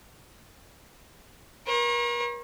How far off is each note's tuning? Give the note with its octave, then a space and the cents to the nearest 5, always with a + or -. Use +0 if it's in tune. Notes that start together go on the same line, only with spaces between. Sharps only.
A#4 +40 C#5 -45